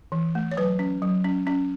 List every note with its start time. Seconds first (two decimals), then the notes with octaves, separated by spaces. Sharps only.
0.12 E3
0.35 A3
0.51 C#5
0.57 F#3 B4
0.79 C#4
1.02 F#3
1.24 C#4
1.47 C#4